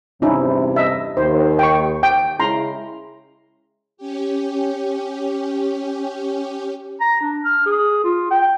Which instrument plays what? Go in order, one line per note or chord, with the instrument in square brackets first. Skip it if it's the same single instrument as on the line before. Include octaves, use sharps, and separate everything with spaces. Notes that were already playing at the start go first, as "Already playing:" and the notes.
[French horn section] E2 G2 C3 [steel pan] C#4 D#4 E4
[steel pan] D#5 E5
[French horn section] D#2 [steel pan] C5
[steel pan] G5 C#6
G5
[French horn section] C#3 G#3 E4 [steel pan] A#5 C6
[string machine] C#4 G4
[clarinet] A#5
D4
F6
G#4
F4
G5